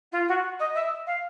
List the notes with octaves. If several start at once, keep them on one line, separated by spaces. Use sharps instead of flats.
F4
F#4
D#5
E5
F5